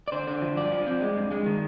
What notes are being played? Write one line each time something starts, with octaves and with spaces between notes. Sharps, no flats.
D5
D3 C5
D3
F3
G2 D5
F3
C4
G#3
G2
G#3
D#3